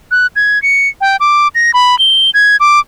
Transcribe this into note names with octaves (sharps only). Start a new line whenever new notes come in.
F#6
G#6
C#7
G5
D6
A#6
B5
G7
G#6
D6